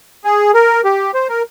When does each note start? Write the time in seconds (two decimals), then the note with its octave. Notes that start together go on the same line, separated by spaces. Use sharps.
0.24 G#4
0.54 A#4
0.84 G4
1.14 C5
1.29 A#4